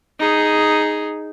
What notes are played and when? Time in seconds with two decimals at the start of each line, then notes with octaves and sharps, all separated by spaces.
0.20 D#4 G#4